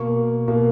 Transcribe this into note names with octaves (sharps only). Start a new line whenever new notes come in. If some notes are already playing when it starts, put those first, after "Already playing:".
Already playing: B2 A#3 C#6
B2 A#3